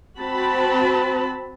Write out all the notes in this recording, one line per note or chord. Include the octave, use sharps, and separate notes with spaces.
C4 F#4 A5 B5